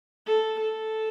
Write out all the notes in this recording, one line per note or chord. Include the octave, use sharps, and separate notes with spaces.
A4
A4